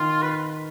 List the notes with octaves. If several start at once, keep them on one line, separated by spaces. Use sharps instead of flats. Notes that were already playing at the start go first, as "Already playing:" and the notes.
Already playing: D#3 F4
B4